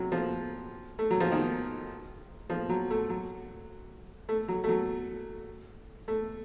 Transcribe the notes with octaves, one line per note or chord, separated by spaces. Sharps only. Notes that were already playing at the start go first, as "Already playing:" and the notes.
Already playing: C3 F#3
F3
A3
F#3
F3
D#3
F3
F#3
A3
F#3
A3
F#3
A3
F#3
A3